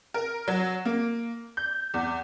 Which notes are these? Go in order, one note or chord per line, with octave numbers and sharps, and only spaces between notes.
A#4
F#3
A#3
G6
E2